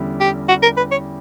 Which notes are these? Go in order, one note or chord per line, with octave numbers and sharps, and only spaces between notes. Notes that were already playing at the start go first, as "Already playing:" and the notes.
Already playing: E2 D3 G3 C#4 E4
G4
F#4
A#4
B4
C#5